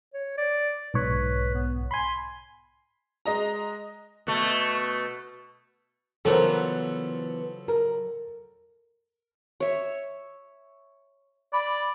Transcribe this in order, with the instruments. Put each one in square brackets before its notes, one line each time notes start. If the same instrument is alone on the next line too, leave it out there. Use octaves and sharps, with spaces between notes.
[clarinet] C#5
D5
[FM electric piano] B1 G#2 C#5 [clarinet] B4
[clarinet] B3
[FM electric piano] G#5 B5 [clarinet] C6
[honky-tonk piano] G#3 D#5 A#5
[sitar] B2 A3
[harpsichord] C#3 F#3 F4 [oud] E3 B3 A#4 [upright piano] A4 C5
[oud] A#4
[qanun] C#5 E5
[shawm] D5 [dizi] B5